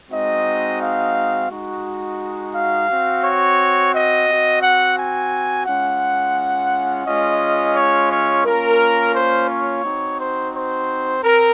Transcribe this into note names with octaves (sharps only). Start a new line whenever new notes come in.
G#3 C4 D#4 F#4 D#5
F5
G#3 D#4 F#4
F5
C4 F#4
C#5
D#5
C4 F#4
F#5
G#5
G#3 C#4 F4 F#5
G#3 C#4 F4 D#5
C#5
C#5
A#3 C#4 F4 A#4
C5
C#5
C4 D#4 F#4
C5
C5
C4 A#4